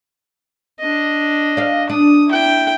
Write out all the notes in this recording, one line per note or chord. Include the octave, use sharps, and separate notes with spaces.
D4 D#5
D5 F5
D4 D#6
E4 G5